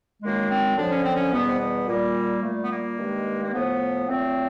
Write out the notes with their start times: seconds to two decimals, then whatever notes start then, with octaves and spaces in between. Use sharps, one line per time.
0.22 F#2 D#3 G#3 A#3
0.49 C4
0.77 F#2 D3 F3 D4
0.90 C#4
1.03 C4
1.15 C#4
1.32 E2 B2 G3 B3
1.47 C4
1.59 B3
1.87 A#2 G3 A#3
2.42 A#2 G3 A3
2.63 B3
2.69 A#3
2.97 G2 D#3 G#3
3.41 A#3
3.53 A2 F3 A3 B3
4.08 A#2 F#3 A3 C4